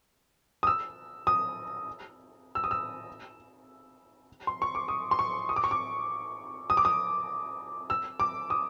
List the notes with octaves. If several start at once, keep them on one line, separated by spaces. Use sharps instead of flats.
D#6
E6
D#6
E6
D#6
E6
C6
C#6
D6
D#6
C6
C#6
D#6
D6
C#6
D6
D#6
D6
D#6
E6
D6
D#6